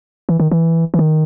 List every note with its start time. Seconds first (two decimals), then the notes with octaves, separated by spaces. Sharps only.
0.29 E3
0.40 D#3
0.51 E3
0.94 E3
0.99 D#3